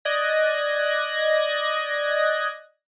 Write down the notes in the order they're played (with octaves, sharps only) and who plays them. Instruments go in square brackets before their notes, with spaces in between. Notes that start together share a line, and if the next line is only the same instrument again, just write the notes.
[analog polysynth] D5 D#5 F#6 G#6 A#6